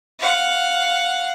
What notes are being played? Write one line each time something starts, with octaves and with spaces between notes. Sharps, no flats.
F5 F#5